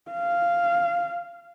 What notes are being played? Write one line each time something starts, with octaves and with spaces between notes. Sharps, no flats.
F5